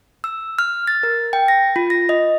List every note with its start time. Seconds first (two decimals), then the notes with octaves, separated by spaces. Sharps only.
0.24 E6
0.59 F6
0.87 A6
1.03 A#4
1.33 G5
1.48 A#6
1.76 F4
1.90 A#6
2.09 D#5